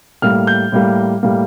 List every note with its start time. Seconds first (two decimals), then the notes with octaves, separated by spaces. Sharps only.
0.22 A2 G3 A#3 F6
0.47 G6
0.72 A2 G3 A#3
1.23 A2 G3 A#3